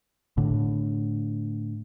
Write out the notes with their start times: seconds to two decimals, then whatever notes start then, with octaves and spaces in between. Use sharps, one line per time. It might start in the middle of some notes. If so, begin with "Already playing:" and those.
0.37 A2 D3